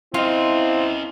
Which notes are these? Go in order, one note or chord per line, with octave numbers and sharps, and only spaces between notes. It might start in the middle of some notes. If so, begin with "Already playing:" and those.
C4 C#4 E4 F4 D#5